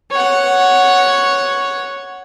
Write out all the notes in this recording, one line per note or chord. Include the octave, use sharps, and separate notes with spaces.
C#5 F#5